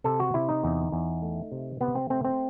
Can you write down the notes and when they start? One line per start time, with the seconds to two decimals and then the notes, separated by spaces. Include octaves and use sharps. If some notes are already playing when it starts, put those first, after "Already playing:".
0.04 C3 A4
0.20 F#4
0.34 C3 E4
0.49 D#4
0.64 E2
0.92 E2
1.22 A3
1.52 C3
1.80 C3 B3
1.95 C4
2.10 A3 C4
2.25 C4